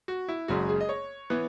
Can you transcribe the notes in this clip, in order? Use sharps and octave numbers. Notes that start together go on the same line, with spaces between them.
F#4
E4
F#1 F#2 C#3 G#3 F#4
G#4
D#5
C#5
E3 B3